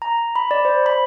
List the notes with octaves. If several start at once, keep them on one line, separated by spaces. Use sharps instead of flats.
A#5
B5
D5
C5
B5